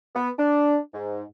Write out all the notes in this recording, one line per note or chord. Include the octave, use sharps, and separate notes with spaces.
B3
D4
G#2